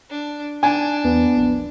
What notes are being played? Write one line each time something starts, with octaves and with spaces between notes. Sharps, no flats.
D4
D4 G#5
E2 B3
A#1